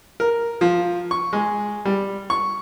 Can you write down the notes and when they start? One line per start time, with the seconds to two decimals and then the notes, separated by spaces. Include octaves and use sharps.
0.20 A#4
0.61 F3
1.11 C#6
1.33 G#3
1.85 G3
2.30 C#6